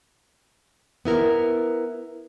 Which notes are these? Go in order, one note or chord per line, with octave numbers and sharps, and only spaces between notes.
B3 E4 A#4